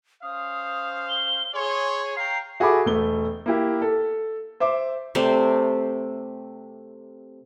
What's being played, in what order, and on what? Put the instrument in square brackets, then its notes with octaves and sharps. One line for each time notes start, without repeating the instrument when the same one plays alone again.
[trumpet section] C#4 C5 F5 [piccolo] D#6
[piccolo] G7
[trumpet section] G#4 C#5 [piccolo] C6
[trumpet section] F5 G5 A#5 [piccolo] C7
[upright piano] F#4 G#4 A4 E5 B5 D6
E1 A3 G7
A#3 E4 G4
A4
C5 E5 D6
[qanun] C3 A3 C5 D5